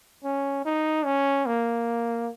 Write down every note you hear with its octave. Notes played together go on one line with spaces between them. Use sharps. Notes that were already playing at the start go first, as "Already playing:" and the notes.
C#4
D#4
C#4
A#3